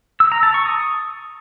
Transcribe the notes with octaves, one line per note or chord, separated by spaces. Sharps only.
E6
A#5
A5
C#6
D#6